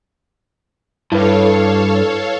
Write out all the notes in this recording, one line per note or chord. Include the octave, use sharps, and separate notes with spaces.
G2 E4 A4 B4 C#5 F5